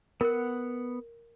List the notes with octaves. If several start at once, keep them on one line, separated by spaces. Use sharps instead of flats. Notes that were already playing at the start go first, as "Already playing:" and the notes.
B3 A#4 F#5